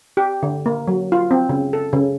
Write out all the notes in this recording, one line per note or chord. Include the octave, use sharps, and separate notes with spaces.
G4
D3
A#3
F#3
F4
C4
C#3
A4
C#3